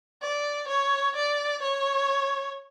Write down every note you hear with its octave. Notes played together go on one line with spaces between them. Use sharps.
D5
C#5
D5
C#5